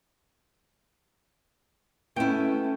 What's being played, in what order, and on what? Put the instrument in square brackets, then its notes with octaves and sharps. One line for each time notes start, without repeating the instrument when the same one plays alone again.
[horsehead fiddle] A3 C#4 [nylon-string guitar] B3 E4 [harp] G5